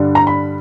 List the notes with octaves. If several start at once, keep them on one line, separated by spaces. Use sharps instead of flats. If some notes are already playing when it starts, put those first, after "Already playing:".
Already playing: G2 D3 G3
A#5
B5